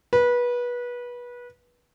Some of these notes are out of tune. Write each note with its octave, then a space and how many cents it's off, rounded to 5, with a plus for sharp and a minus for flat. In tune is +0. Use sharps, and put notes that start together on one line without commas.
B4 -25